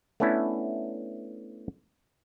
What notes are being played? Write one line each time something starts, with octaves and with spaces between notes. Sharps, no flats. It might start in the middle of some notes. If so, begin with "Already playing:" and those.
A3 B3 C#4 D4 E4